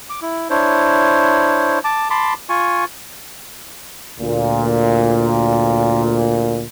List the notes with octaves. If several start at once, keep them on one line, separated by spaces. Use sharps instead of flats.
D6
E4
D4 E4 C5 C#5
A5 D6
A5 B5 C6 D6
F4 G#5 C#6
D2 A#2